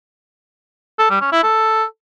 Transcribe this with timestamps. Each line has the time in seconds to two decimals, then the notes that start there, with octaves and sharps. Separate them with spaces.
0.99 A4
1.10 G3
1.21 C#4
1.32 E4
1.43 A4